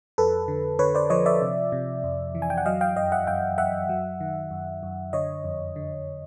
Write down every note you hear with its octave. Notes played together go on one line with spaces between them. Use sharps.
F2 A4 B4
D3
D3 B4 C#5
C5 D5
F3 C#5 D#5
D5 E5
C3
C3
F2
E3
G#5
G5
F#5
F#3 D#5 F5
F5 G5
F#2 D#5 F5
E5 F#5
F#2 F5 G5
F#2 E5 F#5
F#3
D#3
F#2
F#2
D3 C#5 D#5
F2
D3